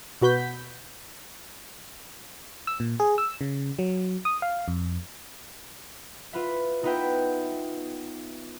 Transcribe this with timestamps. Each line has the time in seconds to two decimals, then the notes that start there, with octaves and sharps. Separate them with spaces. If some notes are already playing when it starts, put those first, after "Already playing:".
0.21 B2 F#4 B4 G6 B6
2.67 E6
2.80 A#2
3.00 G#4
3.18 E6
3.41 C#3
3.79 F#3
4.25 D#6
4.42 F5
4.68 F2
6.33 F4 B4 E5
6.83 B3 D#4 F4 B4 E5 G5